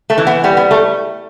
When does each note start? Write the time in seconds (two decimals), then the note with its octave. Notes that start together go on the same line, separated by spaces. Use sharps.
0.10 A3
0.18 E3
0.27 B3
0.44 G3 B3
0.57 B3
0.71 A3